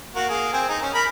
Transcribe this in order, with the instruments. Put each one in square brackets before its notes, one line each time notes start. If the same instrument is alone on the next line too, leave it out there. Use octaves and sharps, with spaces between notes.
[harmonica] A#3 F#4
A#3 G#4
C4 G#5
D#4 G#4
C#4
A#4 B5